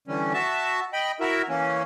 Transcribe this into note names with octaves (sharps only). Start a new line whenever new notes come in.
D3 E3 G3 C#4
F#4 E5 A5
D#5 G5 B5
E4 F#4 A#4 E5
E3 A#3 C#4